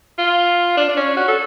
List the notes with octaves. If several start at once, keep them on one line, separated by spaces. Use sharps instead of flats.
F4
D4
D4
C#4
F#4
A4